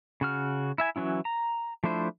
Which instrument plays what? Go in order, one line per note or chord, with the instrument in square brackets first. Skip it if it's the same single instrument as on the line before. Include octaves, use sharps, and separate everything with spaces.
[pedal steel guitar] C#3 F#4 F6
E4 E5 G#5
E3 F#3 C#4 E4
A#5
F3 A3 D4 E4 C5